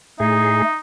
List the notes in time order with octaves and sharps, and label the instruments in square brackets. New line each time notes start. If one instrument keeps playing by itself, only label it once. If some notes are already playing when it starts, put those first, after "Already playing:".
[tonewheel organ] A2 G#4 [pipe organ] A3 [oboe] D#4